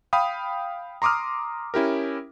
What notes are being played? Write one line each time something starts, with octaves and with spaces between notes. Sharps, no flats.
F5 G5 B5 D#6
A#5 C6 D6 D#6 F6
C#4 E4 G4 A#4